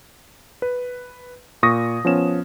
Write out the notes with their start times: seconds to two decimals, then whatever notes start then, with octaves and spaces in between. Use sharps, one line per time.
0.62 B4
1.63 A#2 C#6 D#6 A#6
2.05 F3 B3 C#4 E7